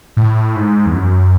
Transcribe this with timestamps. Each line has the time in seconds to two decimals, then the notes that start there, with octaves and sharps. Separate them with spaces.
0.17 A2
0.56 G#2
0.86 E2
0.95 F#2